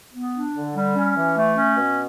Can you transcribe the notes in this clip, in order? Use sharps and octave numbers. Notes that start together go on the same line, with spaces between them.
B3
D4
D3
G3
C#4
E3
A3
C#4
B2